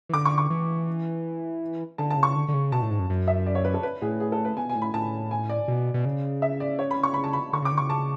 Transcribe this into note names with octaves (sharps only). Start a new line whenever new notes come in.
E3
D3 D6
C#6
C#6
E3
D3 A5
A5
C#3
C#6
D3
D3
C#3
B2 A5
A2
G#2
F#2
F#2
E5
D5
C#5
B4
A4
B4
A2 G#4
G#4
A4
B4
B2 G#5
G#5
A2
B5
A2 A5
G#5
D5
B2
B2
C#3
E5
D5
C#5
B5
C#6
B5
A5
B5
D3 C#6
C#3
D6
D3
C#3 C#6
A5